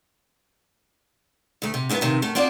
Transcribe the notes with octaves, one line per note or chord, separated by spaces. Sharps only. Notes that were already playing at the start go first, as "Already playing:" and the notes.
D2 A3
C3
G2 A#2 B3 E4
G2 C3 D#3
F#2 A3
C4 D4 F4 F#4 G#4 D5